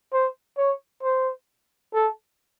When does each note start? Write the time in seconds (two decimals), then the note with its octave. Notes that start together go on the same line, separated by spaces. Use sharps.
0.13 C5
0.58 C#5
1.03 C5
1.94 A4